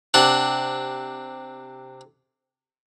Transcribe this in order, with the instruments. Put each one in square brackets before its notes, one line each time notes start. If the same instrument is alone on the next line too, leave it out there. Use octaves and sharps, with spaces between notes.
[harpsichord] C3 D4 F#5